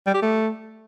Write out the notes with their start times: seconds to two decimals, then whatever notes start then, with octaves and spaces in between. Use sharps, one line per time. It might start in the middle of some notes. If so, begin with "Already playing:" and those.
0.07 G3
0.14 G4
0.22 A3